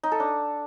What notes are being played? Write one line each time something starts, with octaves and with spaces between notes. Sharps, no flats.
D#4
A4
D4